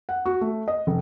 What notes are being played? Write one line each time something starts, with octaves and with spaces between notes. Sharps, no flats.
F#5
F#4
A3
D#5
F1